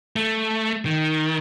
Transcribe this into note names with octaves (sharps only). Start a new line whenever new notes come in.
A3
D#3